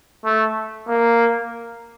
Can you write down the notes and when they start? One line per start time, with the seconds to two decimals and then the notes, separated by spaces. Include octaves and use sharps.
0.25 A3
0.88 A#3